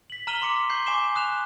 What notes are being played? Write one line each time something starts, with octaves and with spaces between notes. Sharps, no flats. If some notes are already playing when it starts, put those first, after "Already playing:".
B6 F#7
A#5 F6 D#7 F#7 G7
C6 D6 C#7
C6 C#6 G6 C7
G#5 D6 C7 E7 G7
D#6 F#6 E7 F7